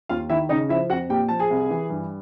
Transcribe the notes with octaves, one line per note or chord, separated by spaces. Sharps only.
D#2 F4 F5
D#3 E4 E5
C#3 D#4 D#5
F3 E4 E5
F2 F#4 F#5
A#2 G4 G5
F3 A5
G#4 G#5
C2
E3
G2